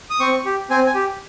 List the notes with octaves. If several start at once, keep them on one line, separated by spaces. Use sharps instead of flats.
D#6
C4 C#6
G4
C4 G#5
G#5
G4